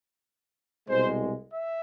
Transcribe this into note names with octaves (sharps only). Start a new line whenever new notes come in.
C2 B2 G#3 C5
E5